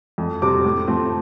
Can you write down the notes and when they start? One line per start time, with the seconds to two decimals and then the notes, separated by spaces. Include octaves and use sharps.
0.18 F2
0.42 C3 G3 C4 D6
0.64 A2
0.88 F3 A3 C4